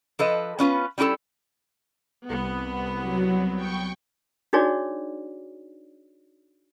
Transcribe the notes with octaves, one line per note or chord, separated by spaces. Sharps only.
F3 A4 B4 D#5
B3 C#4 F4 B4
G3 C#4 E4 F#4 A4
C2 B3
F#3
G5 C#6
D4 D#4 F#4 G#4 C#5 D5